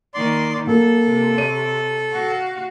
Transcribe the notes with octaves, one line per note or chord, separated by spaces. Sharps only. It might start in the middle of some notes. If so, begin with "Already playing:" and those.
D#3 A#3 D5 C6
F#2 A#3 A4
C3
C#5 D#7
F#4 F5